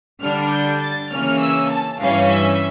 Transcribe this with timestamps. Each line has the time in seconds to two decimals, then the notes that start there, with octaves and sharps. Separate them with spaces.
0.21 D3 G3 D4 F6
0.51 G6
0.81 A6
1.10 C#3 E3 A#3 C#4 F6
1.40 E6
1.70 A5
1.99 G2 E3 G3 C#4 F5
2.29 E5